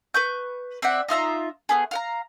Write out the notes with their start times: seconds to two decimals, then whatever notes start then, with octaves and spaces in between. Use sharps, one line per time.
0.14 B4 C#6 G6
0.82 C4 D5 E5 F#5
1.09 D#4 F4 E5 A#5
1.69 A3 B3 G#4
1.91 F5 F#5 A#5